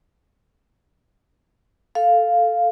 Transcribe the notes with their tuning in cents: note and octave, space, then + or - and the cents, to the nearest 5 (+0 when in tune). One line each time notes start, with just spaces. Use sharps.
A4 +0 F5 +0